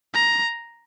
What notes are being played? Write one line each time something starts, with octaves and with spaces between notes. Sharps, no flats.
A#5